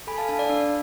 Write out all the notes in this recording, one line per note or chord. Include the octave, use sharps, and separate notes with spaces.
A4 G#5 B5
F5 A5
D4 F5 A5
D5 F5
D4